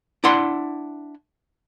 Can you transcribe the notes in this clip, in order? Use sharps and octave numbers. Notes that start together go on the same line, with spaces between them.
D4 E4 F#5 B5 C6